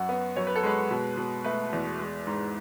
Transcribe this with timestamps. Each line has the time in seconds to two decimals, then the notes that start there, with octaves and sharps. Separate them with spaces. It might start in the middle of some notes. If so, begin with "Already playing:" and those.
Already playing: F#2 F#4
0.09 B3
0.36 F#2 C#5
0.47 B4
0.56 A4
0.63 G#3 B4
0.91 B2
1.17 B2
1.44 A3 B4
1.73 E2
1.99 G#3
2.27 G#2